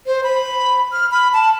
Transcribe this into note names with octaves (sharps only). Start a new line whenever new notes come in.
C5
B5
F6
B5
A5